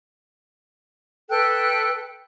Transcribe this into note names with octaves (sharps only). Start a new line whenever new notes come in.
A4 B4 G5 F#6